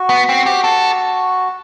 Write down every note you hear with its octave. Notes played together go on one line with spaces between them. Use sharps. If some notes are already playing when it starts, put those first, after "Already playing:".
Already playing: F#4
B3
C4
G4
A4